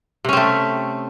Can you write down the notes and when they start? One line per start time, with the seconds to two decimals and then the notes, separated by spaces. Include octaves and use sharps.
0.25 C3
0.29 C#4
0.33 C4
0.37 A3